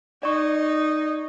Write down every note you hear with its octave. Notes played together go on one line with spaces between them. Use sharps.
D#4 D5 C#6